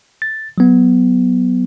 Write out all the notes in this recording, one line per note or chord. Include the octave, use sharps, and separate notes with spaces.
A6
F#3 B3